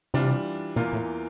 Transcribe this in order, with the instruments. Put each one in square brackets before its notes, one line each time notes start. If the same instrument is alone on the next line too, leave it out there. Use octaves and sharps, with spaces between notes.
[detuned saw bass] C3 [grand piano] E3 G3 D4 F4
[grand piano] E2 E3 A#3 F4 [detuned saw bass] A#2
[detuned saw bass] A2